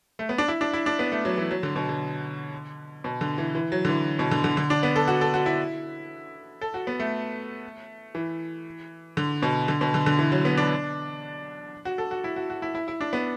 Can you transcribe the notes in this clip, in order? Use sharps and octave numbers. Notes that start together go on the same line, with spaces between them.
A3
B3
D4
E4
D4
E4
D4
B3
A3
F#3
E3
F#3
D3
B2
D3
B2
D3
E3
E3
F#3
D3
E3
B2
D3
D3
D3
D4
B3
A4
F#4
A4
F#4
E4
A4
F#4
B3
A3
E3
D3
B2
D3
B2
D3
D3
E3
F#3
B3
D4
F#4
A4
F#4
E4
F#4
F#4
E4
E4
E4
D4
B3